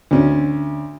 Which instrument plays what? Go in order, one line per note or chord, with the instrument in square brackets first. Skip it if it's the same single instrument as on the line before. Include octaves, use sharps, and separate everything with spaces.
[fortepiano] D2 C#4